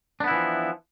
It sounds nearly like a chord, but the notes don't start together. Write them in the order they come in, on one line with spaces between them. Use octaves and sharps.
D4 B3 E4 E3 F3